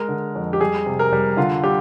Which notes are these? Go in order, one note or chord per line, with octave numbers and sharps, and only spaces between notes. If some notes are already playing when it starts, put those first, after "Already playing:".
Already playing: G#3 A#4
D3
F2
G4
G3 G#4
C3
A#4
G3
D3 F4
G3 G4